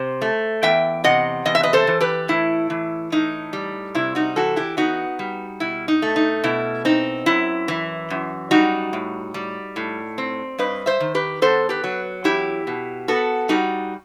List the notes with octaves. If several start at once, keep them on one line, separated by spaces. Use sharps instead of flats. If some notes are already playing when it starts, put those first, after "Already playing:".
Already playing: C3 C5
A3
E2 E5 G5
C3 D#5 F#5
E2 D#5
E5
B4 D#5
A4 C5
E3
G4 B4
A2 E4
E3
A2 D#4
G3
C3 E4
D#4 F#4
E3 F#4 A4
E4 G4
B3 D#4 F#4
G3
B2 E4
D#4
A3
D#4
B2 E4
C4 D#4
F#2 E4
E3
F#2
G3 D#4 F#4
A2
G3
A2
C4
G2 B4 D#5
C5 E5
D#3
G4 B4
B3 A4 C5
G4 B4
F#3
E2 E4 G4
B2
B3 F#4 A4
G3 D#4 F#4